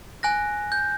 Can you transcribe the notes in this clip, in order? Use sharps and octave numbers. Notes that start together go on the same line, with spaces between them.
G#5 F#6 A#6
G6